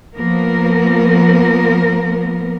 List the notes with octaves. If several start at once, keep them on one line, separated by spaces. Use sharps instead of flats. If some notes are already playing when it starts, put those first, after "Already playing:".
F3 A#3 B3 A#4